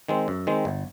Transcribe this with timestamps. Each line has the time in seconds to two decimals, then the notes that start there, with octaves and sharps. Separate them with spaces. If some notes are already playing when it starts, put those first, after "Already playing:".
0.08 D#3 G#3 C4
0.28 F#2
0.47 D#3 G#3 C4
0.65 G1